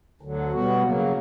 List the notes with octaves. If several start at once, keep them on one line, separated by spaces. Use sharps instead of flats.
D2 D3 F#3
B2 G3 B3 F#4
C#3 F#3 A#3